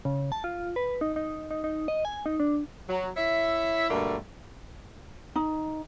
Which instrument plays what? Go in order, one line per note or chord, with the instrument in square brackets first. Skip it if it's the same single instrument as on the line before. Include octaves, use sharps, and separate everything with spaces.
[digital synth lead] C#3
A5
F4
B4
D#4
D#4
D#4
D#4
D#5
G#5
D#4
D4
[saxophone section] F#3
E4 C#5 E5
G2 B2 D3 A3 A#3
[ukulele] D#4